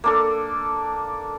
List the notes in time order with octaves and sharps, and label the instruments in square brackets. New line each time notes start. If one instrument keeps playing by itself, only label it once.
[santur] A#3 D4 A4